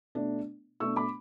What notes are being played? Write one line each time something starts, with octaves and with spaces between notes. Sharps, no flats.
B2 A3 D4
B2 A3 D4 C#6 E6
B5 D6